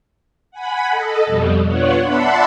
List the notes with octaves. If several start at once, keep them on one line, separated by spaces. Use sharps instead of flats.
F#5 G#5 B5
A4 D#5
F2 B2 G3
B3 D4 F4 C#5 F#5
D5 E5 F#5 A5 B5 C6